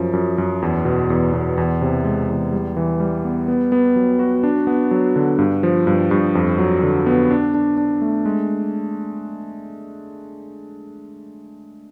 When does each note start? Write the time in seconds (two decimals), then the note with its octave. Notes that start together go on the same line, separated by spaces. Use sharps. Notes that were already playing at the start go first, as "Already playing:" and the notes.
Already playing: F#2 F3
0.13 F#2
0.38 F#2
0.62 E2
0.85 B2
1.10 E2
1.34 B2
1.58 E2
1.82 C3
2.04 G#3
2.29 E2
2.52 G3
2.77 E3
3.00 G3
3.24 B3
3.48 B3
3.72 B3
3.96 F#3
4.19 F#4
4.43 D4
4.67 B3
4.91 F#3
5.16 D3
5.39 G2
5.63 F3
5.87 G2
6.11 G2
6.35 F2
6.58 F#3
6.83 D3
7.06 B3
7.31 D4
7.54 D4
7.78 D4
8.02 A3
8.26 G#3